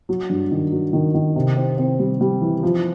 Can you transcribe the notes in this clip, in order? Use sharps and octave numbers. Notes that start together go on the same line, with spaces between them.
F#3
G2
D#3
F#3
D#3
D#3
C3
C4
C4
G3
G3
E3
F3